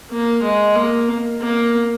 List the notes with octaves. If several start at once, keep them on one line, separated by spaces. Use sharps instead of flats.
A#3
G#3
A#3
A#3